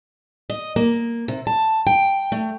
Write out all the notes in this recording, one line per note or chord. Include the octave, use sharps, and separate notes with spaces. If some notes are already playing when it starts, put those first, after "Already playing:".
D#5
A#3
C3
A5
G5
A3